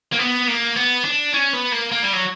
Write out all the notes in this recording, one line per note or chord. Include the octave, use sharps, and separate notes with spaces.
A#3
B3
A#3
B3
D4
C#4
B3
A#3
A#3
G3
F#3